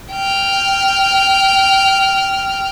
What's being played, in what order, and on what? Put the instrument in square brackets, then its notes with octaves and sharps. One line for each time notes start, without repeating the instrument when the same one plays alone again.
[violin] G5 F6